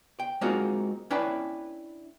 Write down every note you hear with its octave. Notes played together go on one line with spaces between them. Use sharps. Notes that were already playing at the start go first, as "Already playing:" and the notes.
G5
G#3 A#3 C4 D#4 F4 F#4
C#4 D4 E4 B4 G5 A#5